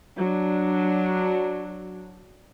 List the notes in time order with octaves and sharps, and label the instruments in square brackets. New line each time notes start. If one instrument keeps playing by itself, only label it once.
[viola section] F#3 D4